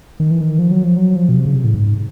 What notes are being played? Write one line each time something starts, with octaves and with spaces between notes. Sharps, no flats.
D#3
E3
D#3
F3
F#3
F3
F#3
F3
B2
C3
C#3
C3
A2
G#2